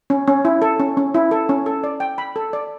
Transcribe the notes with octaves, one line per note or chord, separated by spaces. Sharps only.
C#4
C#4
E4
A4
C#4
C#4
E4
A4
C#4
A4
D5
G5
B5
A4
D5